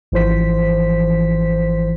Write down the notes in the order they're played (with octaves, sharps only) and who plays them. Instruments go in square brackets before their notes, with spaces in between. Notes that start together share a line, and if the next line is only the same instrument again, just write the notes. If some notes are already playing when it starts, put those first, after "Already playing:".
[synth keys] G#1 E3 F3 C5 B6